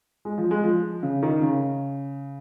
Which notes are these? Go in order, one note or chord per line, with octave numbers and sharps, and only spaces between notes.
G#3
F3
G#3
F3
C#3
D#3
C#3